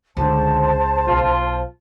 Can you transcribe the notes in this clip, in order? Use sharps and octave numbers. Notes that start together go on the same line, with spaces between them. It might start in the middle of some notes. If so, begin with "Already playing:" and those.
D#1 C#2 D3 C5 A5
B1 F4